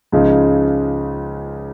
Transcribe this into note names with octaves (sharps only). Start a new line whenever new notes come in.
C#2 C#3 F3 G#3 D#4